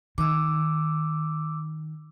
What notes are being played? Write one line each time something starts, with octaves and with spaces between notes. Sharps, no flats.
D#3 D6 E6